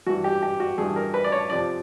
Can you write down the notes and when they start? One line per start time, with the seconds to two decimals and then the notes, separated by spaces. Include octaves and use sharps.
0.07 G2 E3 F#4
0.24 G4
0.43 G4
0.60 F#4
0.78 G2 E3 G#4
0.96 A#4
1.14 B4
1.24 D5
1.32 C#5
1.50 F2 C3 F3 D5